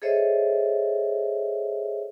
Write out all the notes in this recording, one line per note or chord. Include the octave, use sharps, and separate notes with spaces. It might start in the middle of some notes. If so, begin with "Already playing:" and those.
G#4 A4 C5 C#5 D#5 E5